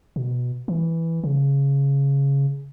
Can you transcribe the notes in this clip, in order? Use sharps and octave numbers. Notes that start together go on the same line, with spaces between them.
B2
E3
C#3